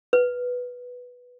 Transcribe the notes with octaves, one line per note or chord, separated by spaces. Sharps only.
B4